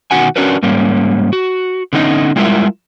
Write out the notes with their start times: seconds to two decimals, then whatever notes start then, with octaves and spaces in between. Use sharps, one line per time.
0.11 B2 D#3 F#4 F#5 G#5
0.36 C#4 D4 F#4 A#4 B4
0.63 G#2 G3 A#3 C#4
1.33 F#4
1.93 D3 B3 C#4 D#4 D#5
2.36 G3 G#3 E4 F4 A#4 E5